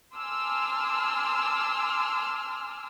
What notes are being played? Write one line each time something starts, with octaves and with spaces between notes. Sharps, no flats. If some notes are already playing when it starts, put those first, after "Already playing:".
G#5 A5 C6 D6 E6 F6